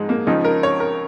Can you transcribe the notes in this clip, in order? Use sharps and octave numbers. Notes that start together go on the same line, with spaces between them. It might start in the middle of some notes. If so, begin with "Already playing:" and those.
Already playing: G#2 F3 G#3 D#4
A#3
C#2 C#3 F3 D#4
A#4
C#5
A#4